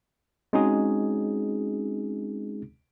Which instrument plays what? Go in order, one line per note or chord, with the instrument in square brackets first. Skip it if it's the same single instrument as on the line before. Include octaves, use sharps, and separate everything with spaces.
[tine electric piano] G#3 C4 C#4 D#4 F#4 G#4